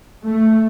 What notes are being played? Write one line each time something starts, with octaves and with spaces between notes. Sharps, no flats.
A3